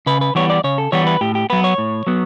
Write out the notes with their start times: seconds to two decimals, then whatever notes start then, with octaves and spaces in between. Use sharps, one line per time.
0.06 C#3 B4
0.21 B4
0.35 E3 G3 B3 C#5
0.50 D5
0.64 C#3 C#5
0.78 A4
0.92 E3 G3 B3 C#5
1.07 B4
1.21 A2 G4
1.35 G4
1.50 F#3 B3 B4
1.64 C#5
1.78 A2
2.07 F#3 B3